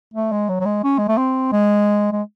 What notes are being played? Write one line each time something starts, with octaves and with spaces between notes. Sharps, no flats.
A3
G#3
F#3
F#3
G#3
C#4
G#3
A3
C4
G#3
G#3